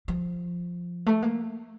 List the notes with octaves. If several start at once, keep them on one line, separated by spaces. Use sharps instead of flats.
F3
A3
A#3